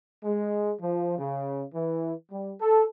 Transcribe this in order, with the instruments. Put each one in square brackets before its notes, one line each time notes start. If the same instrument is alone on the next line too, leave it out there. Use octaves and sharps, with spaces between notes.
[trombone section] G#3
F3
C#3
E3
G3
A4